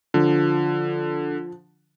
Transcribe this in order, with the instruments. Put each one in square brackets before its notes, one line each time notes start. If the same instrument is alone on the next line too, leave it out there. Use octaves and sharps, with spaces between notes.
[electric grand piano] D3 [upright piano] F3